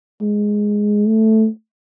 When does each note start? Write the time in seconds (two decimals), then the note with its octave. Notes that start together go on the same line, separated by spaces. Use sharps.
0.22 G#3
1.08 A3